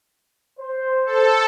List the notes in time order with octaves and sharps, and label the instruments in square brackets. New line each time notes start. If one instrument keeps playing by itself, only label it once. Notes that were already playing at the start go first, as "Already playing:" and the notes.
[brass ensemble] C5
[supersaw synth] A4